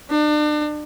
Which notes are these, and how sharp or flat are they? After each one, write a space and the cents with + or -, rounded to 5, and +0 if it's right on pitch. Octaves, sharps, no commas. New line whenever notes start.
D4 +35